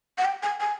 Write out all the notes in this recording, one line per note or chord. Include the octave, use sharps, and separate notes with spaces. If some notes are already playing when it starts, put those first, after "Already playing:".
F#5
G5
G#5
G#5